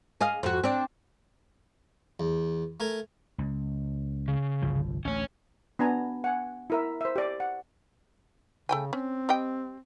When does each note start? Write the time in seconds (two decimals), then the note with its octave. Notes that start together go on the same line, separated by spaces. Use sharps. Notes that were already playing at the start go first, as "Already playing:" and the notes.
0.21 G#4 D#5 F5
0.43 F2 F#4
0.64 C4 D4
2.20 E2
2.80 A3 A#4 G#5 A#5
3.38 C#2
4.28 C#3
4.62 G1 C2 F3
5.05 A1 D2 C#4 C#5
5.79 B3 D4 G#5 A#5
6.24 F#5 G#5
6.70 E4 A#4 E5
7.01 C5 E5
7.16 G4 D5
7.40 F#5
8.69 C#3 A3 G5 G#5
8.93 C4 C#4
9.29 G3 D#5 G5